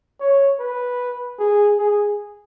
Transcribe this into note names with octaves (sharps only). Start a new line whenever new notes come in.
C#5
B4
G#4
G#4